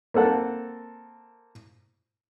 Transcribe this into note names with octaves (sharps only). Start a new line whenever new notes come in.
A#3 C4 A4 F#5